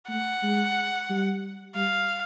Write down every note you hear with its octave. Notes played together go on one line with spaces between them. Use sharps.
A3 F#5
G#3
G3
G3 F5